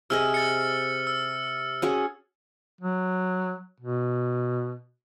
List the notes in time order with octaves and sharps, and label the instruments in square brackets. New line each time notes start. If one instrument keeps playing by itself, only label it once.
[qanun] C3 G#4 D#5 [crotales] E6 F6
[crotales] A6 C#7
E6
[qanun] C#4 F#4 G#4
[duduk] F#3
B2